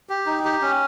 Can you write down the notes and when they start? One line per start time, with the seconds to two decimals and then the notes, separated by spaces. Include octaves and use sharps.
0.09 G4
0.26 D#4
0.45 G4
0.62 C#4